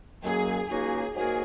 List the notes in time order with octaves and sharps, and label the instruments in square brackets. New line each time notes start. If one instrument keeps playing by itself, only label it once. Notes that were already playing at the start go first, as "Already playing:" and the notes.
[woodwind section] F#2 D#3 F#3 A#3 [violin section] G#4
[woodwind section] C#2 C#3 A#3 D#4 F#4 [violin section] G#4
[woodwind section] G#2 F#3 A#3 F#4 A#4 [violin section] G#4